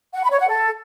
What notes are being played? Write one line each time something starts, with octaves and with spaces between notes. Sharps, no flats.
F#5
B5
C#5
F#5
A4